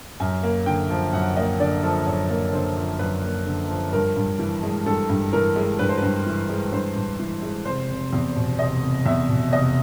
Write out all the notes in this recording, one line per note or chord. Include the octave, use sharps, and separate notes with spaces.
F#2 G#5
A#3
D3 G5
F3
F#2 F#5
A#3 D#5
D3 D5
F3 A4
F#2 C#5
A#3
D3 C5
F3
F#2 B4
A#3
D3
F3
G2 A#4
G2
E3
G#3
G2 A4
G2
E3 A#4
G#3
G2 B4
C5
G2 B4
E3
G#3
G2 C5
G2
E3
G#3
F1 C5
F1
E2
B2
F1 D#5
F1
E2 E5
B2
F1 D#5